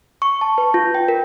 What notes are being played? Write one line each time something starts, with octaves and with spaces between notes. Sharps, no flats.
C#6
A5
B4
F4
G5
A#4